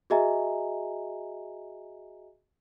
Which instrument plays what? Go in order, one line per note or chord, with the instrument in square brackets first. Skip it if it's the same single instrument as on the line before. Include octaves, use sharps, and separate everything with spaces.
[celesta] F#4 G#4 D#5 E5 G#5 A#5